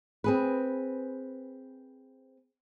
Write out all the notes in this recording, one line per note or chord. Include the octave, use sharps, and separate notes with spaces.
C4 G#4 B4